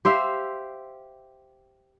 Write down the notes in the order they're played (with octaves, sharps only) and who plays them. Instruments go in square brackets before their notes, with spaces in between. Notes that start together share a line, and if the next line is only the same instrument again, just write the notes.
[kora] G4 C5 E5 F5